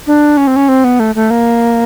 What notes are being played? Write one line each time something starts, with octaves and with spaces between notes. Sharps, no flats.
D4
C#4
C4
C#4
C4
B3
A3
A3
A#3